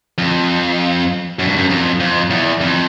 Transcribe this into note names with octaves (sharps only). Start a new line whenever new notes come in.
F2
F#2
G2
F#2
F2
F2
E2
F2